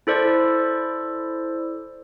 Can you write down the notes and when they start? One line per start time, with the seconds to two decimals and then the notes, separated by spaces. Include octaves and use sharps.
0.07 E4 A4 C5 D5